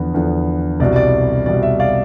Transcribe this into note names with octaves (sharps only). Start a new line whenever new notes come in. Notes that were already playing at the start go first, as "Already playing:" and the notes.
Already playing: E2 D3 F3 B3
E2 D3 F3 B3
C2 B2 G3 D5
D5
C2 B2 G3 D5
E5
D5 F5